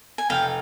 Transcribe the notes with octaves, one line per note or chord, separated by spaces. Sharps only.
G#5
F1 F5 G5